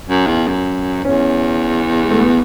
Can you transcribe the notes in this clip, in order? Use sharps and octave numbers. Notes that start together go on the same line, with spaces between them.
F#2
E2
F#2
E2 C#4
G#3
A3
B3